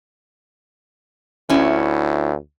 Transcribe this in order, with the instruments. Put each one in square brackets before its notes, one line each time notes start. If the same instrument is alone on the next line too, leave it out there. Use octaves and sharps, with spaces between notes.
[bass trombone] D2 [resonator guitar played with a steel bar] C#4 E4